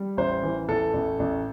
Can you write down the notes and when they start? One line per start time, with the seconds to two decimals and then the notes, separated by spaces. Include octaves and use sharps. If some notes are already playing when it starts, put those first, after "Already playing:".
Already playing: G3
0.17 A1 C5
0.43 E3
0.69 A1 A4
0.94 A1
1.19 A1